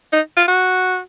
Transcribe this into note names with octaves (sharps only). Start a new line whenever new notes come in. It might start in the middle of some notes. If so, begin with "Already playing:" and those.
D#4
F4
F#4